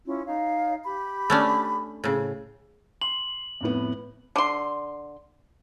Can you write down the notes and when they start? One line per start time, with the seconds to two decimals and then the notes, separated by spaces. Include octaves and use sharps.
0.07 C#4 E4 F4
0.25 D#4 C#5 F5
0.84 G4 B5
1.30 A3 C#4 D4
2.04 A2 C#3
3.01 C6 F#7
3.61 F2 A2 B3
4.36 D3 C6